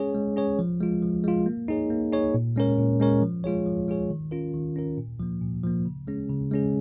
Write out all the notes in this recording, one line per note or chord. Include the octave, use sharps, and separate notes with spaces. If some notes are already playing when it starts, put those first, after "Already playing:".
Already playing: G#3 C#4 G#4 C#5
G#3
C#4 G#4 C#5
F3
G#3 F4
F3
G#3 F4
A#3
D#4 G#4 C#5
A#3
D#4 G#4 C#5
A#2
G#3 C#4 A#4 C#5
A#2
G#3 C#4 A#4 C#5
F3
G#3 F4 G#4 C#5
F3
G#3 F4 G#4 C#5
D#3
C#4 F4 A#4
D#3
C#4 F4 A#4
A#2
F3 A#3
A#2
F3 A#3
C#3
G#3 C#4 G#4
C#3
G#3 C#4 G#4